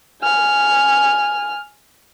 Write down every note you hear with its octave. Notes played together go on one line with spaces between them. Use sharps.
G#5 F6